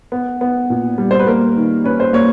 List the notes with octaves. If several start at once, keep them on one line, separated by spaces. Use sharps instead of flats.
B3
B3
A#2
G3
C5
B4
A#3 A#4
D#3
C#4 B4
C5
A#3 C#5